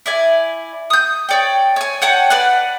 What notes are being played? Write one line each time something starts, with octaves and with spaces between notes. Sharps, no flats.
E4 D5 G#5
D#6 G6
C#5 D5 G5
C#5 G#5
C#5 F#5 G5 A5
B4 D5 F#5